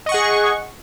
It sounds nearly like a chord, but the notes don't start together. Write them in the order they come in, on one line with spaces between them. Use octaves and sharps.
D#5 C#6 F#5 G#4